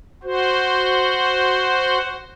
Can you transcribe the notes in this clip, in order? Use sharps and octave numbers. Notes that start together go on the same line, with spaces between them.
F#4 C5